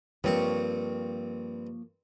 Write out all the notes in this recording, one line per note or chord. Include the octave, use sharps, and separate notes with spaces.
G2 F3 A#3 C4 C#5 C#6